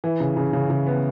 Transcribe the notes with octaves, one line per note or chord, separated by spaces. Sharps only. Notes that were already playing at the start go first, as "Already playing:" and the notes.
E3
C#3
C#3
C#3
C#3
B3